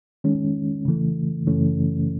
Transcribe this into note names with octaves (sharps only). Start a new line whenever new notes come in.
D#3 G#3 C#4
C#3 E3 A3
F#2 C#3 E3 A3 C#4